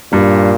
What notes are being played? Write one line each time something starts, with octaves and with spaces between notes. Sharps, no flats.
G2 A#2